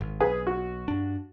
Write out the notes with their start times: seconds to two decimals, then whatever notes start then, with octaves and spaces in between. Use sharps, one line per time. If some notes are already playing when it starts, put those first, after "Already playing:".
0.01 G#1
0.20 B1 G#4 B4
0.47 F#4
0.88 G2 D4